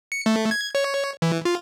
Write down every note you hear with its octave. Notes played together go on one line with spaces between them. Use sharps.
C#7
A3
G#6
C#5
E3
F4